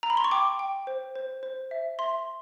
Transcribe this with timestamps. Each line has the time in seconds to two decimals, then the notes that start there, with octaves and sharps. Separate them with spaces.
0.03 A#5
0.10 B5
0.17 C6
0.24 C#6
0.31 G5 D6
0.59 G5
0.87 C5
1.15 C5
1.43 C5
1.71 E5
1.99 E5 C6